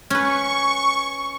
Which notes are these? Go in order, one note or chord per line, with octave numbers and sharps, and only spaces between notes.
C#4 B4 C#6